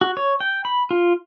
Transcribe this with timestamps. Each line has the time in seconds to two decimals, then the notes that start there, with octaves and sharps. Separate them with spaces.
0.01 F#4
0.17 C#5
0.40 G5
0.65 B5
0.91 F4